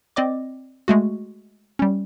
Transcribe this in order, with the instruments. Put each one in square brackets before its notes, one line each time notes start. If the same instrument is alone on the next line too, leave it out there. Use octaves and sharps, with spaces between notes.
[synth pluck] C4 D5 D#5 D6
G#3 A3 F#4
G3 C#4